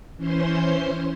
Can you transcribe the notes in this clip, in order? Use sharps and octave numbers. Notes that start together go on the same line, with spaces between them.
E3 C#4 C5 C6